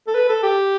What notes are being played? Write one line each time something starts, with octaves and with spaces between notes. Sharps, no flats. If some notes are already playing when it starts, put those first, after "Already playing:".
A4
B4
A4
G4